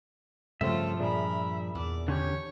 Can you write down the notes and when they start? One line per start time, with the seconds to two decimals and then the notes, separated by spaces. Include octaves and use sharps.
0.61 G2 C#3 F3 A3 C4 F4 A4 E5
0.99 A#2 D4 G#4 A#4 B5
1.75 E2 D5
2.08 D3 C#4 G4 C#5